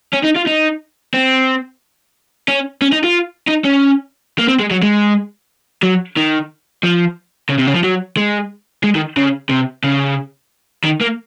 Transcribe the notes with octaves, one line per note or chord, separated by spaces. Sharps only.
C#4
D#4
F4
D#4
C4
C#4
C#4
D#4
F4
D#4
C#4
A#3
C4
G#3
F#3
G#3
F#3
D#3
F3
C#3
C3
C#3
F3
F#3
G#3
G#3
D#3
C#3
C3
C#3
D#3
A#3